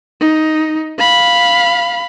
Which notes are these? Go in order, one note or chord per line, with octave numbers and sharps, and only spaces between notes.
D#4
F5 B5